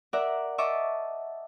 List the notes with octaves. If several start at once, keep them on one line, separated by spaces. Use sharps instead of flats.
A#4 D5 E5 F#5
D#5 E5 A5 C#6 D6